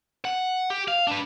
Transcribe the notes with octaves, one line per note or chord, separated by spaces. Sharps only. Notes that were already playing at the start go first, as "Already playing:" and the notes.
F#5
G4
F5
D4 B4